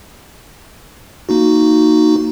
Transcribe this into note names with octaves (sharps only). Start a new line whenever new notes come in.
A#3 D#4 F#4